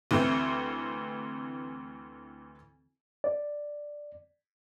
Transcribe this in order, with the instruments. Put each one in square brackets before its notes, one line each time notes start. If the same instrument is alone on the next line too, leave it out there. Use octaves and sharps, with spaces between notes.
[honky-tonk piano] D2 E3 A3 C4
[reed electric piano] D5